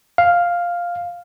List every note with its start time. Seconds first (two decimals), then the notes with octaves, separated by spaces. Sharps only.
0.18 F5